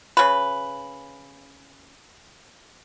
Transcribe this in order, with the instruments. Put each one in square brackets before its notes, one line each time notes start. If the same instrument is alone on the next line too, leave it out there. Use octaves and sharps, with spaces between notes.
[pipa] C#3 B4